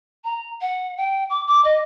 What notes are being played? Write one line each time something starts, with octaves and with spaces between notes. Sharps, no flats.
A#5
F#5
G5
D6
D6
D#5